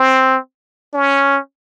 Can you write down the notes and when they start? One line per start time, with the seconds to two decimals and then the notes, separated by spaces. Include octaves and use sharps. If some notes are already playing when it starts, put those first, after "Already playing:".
Already playing: C4
0.93 C#4